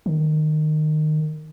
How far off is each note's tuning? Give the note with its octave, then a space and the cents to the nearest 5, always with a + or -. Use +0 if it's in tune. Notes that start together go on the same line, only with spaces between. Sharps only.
D#3 -20